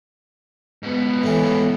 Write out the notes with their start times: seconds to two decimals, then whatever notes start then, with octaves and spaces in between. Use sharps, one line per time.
0.83 G#2 B3
1.23 A2 E3